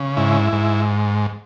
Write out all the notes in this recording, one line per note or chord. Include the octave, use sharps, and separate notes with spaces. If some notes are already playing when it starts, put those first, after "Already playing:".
Already playing: C#3
G#2 E4
G#2